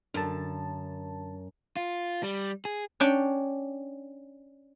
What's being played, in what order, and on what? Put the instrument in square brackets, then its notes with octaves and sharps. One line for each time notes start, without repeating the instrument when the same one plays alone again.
[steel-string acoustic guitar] F#2 [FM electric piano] D3 A5
[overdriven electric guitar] F4
G3
G#4
[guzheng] C#4 D4 G5